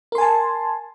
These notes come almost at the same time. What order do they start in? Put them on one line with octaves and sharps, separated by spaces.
A#4 C6 G#5 A5